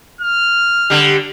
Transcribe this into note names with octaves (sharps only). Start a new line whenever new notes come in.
F6
D3 G3